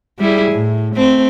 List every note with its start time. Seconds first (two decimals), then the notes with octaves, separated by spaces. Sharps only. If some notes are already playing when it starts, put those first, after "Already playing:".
0.18 G3 E4 G#4
0.52 A2
0.95 A3 C4